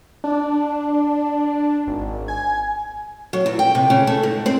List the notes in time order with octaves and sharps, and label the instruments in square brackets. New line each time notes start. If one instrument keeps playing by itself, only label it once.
[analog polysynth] D4
G#1
G#5
[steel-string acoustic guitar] F#3
E2
G5
C3
C#3
A3
G#2
C4